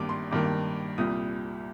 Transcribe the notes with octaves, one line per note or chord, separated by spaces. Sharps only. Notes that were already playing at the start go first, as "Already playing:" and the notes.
Already playing: G#1 G2 D#3 A#3 D6
C6
G#1 G2 D#3 A#3 D6
C2 A#2 G3 D#6